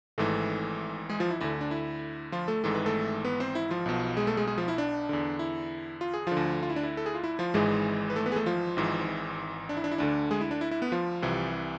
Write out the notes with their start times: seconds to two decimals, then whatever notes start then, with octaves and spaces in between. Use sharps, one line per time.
0.18 G#1 G#2 E3 A3 A4
1.09 G#3 G#4
1.20 F3 F4
1.30 E4
1.41 D2 D3 E4
1.61 D4
1.71 E4
2.32 F3 F4
2.48 A3 A4
2.64 G#1 G#2 E3 A4
2.75 B4
2.86 A3 A4
3.25 B3 B4
3.40 C4 C5
3.55 E4
3.71 F3 F4
3.86 B1 B2
4.17 G#3 G#4
4.27 A3 A4
4.37 G#3 G#4
4.47 G#3 G#4
4.58 F3 F4
4.68 E4
4.78 D4
5.09 E2 D3
5.39 E4
6.01 F4
6.14 G#4
6.27 D3 F3 F4
6.37 D2
6.63 F4
6.69 E4
6.76 D4
6.83 E4
6.97 A4
7.06 G#4
7.15 F4
7.24 E4
7.39 F3 F4
7.54 G#1 G#2 E3 G#3 G#4
8.10 B4
8.16 A3 A4
8.26 B3 B4
8.32 G#4
8.36 A3 A4
8.46 F3 F4
8.77 G#1 G#2 E3
9.69 D4
9.77 E4
9.84 D4
9.91 E4
9.98 D2 D3 D4
10.31 G#3 G#4
10.41 E4
10.51 D4
10.61 E4
10.71 E4
10.82 B3 B4
10.92 F3 F4
11.22 C2 C3 E3